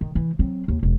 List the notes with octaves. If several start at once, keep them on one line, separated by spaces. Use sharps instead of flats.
D#3
E3
F#3 C4
D#2
E1